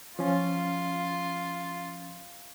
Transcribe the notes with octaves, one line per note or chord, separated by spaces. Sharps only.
F3 C#4 F4